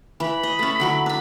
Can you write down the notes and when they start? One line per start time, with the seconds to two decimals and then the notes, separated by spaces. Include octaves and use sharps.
0.20 E3 B5
0.43 D#5
0.59 A3 C#4
0.80 D3 F#3 E4
1.06 D4 B5